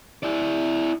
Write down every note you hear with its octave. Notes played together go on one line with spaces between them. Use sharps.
E4 D5